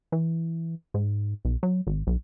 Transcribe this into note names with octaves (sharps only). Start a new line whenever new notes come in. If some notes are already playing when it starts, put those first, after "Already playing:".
E3
G#2
B1
F#3
G#1
B1